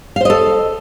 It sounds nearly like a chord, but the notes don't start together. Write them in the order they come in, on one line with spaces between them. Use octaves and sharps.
F5 C5 D#5 A4